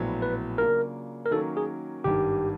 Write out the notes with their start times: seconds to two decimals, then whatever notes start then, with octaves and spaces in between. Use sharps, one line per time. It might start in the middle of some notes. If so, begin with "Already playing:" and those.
Already playing: A#1 A2 F#3 B3
0.22 B4
0.58 C#3 F#3 A#3 D4 F4 A#4
1.26 A#4
1.31 D#3 F#3 A#3 C#4 A4
1.57 G#4
2.04 G#1 G2 D#3 G4